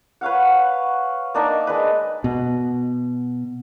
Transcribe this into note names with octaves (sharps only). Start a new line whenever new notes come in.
B4 C#5 F5 F#5
A#3 D4 D#4 A#4
G#3 D4 B4
B2